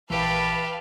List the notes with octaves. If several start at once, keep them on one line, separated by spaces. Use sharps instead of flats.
A#1 E3 G4 B4 E5 F5 A5